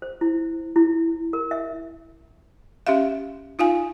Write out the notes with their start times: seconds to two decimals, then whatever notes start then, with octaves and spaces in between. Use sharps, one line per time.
0.02 C5
0.21 E4
0.76 E4
1.33 A#4
1.51 E5
2.87 C#4 G4 E5 F5
3.59 D#4 F4 F5 G#5